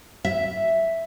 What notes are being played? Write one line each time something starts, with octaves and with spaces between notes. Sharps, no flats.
E5